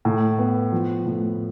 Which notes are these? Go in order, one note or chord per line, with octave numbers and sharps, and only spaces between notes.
A2
B3
F3
A2